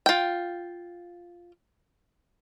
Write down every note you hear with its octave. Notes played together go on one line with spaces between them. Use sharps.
F4 G5